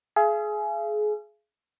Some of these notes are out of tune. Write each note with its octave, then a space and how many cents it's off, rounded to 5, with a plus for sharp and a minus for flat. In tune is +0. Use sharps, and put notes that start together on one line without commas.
G#4 +25 F5 -45